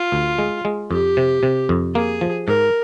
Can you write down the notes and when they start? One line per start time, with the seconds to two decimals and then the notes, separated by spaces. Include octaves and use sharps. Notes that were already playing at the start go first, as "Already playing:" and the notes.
Already playing: F4
0.12 D2
0.39 G#3
0.65 G#3
0.91 F2 G4
1.17 C3
1.43 C3
1.69 F2
1.95 A#3 G#4
2.21 F3
2.47 G#2 A#4